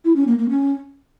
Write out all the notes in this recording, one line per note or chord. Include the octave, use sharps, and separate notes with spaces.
E4
C#4
A#3
A#3
C#4